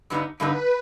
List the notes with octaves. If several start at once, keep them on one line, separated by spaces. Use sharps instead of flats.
G2 D3 G3 B3 D#4
G2 D3 G3 B3 D#4 B4